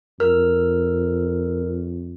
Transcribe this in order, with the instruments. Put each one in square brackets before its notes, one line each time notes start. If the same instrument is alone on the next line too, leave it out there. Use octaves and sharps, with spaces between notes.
[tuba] F2 [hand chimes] A#4 F6